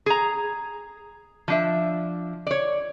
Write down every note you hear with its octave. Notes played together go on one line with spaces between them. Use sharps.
G#4 A#5
F3 D4 E5
C#5 D5